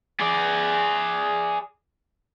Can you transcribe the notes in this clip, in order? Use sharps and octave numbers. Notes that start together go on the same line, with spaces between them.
G#4 D5